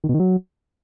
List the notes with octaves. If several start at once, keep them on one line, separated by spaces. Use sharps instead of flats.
D#3
B2
D#3
F#3